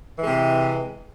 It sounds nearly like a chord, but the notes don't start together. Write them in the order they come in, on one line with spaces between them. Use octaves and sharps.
E3 G#3 C3